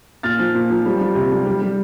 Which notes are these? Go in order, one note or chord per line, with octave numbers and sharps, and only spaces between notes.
A#2 F6 A6
F3
A#2
F3
G3
G3
C3
G3
G3
G3